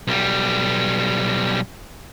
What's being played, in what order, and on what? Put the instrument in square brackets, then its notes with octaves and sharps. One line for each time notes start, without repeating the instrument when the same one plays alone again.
[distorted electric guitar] B1 G3